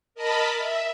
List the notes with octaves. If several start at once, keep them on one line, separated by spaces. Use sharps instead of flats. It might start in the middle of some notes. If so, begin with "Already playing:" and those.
A#4 D#5 A5 B5
E5